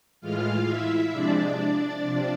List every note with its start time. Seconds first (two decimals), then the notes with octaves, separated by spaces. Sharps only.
0.21 A2 E3 G#3 F4 F5
0.66 E4 E5
1.11 C3 F3 G#3 D4 D5
2.03 C3 F3